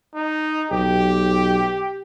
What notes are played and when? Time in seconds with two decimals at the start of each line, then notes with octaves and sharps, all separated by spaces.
0.15 D#4
0.71 B1 G4